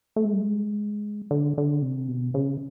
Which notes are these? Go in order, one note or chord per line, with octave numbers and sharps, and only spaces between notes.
A3
G#3
G3
G#3
D3
D3
C3
B2
C#3